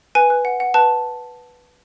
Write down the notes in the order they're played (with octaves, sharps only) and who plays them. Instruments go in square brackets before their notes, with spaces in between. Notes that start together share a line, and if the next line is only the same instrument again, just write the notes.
[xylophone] B4 G#5
B4
F#5
F#5
B4 A5